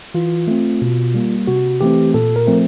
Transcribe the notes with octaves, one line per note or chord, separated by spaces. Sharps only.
E3 F4
A3 C4
B2
G3 A#3
C3 F#4
E3 A3 C4 G4
A#2 A4
A#4
F3 A3 C4